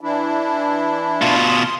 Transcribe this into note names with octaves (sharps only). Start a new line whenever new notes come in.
E3 D4 E4
B2 F4
C6 D#6